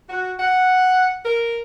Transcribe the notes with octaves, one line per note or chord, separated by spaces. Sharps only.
F#4
F#5
A#4